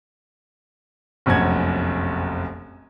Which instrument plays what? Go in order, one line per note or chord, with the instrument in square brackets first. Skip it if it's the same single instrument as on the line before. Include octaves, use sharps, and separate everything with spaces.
[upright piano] F1 A#1 F#2 F#5 G#6